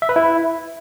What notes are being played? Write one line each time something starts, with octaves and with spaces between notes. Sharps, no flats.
E5
B4
E4